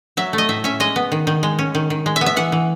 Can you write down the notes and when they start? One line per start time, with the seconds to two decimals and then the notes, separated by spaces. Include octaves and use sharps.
0.17 F#3 E5
0.33 A3
0.38 D#5
0.49 A2 E5
0.64 C#4 E5
0.80 G#3 D#5
0.96 B3
1.12 D#3
1.27 D#3
1.43 G#3
1.59 C#4
1.75 D#3
1.90 D#3
2.06 G#3
2.16 E5
2.21 B3
2.26 E5
2.36 E3 F#5
2.52 E3